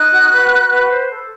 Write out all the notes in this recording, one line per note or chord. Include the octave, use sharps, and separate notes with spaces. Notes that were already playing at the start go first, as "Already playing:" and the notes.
Already playing: D#4 F#6
F#4
B4
F#4
B4
C5
A4